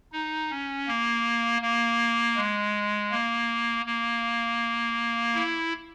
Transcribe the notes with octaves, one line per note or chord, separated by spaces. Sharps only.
D#4
C#4
A#3
A#3
G#3
A#3
A#3
E4